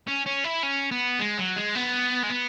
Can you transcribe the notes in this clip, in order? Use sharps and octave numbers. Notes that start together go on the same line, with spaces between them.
C#4
C#4
E4
C#4
B3
G#3
F#3
G#3
B3
G#3
B3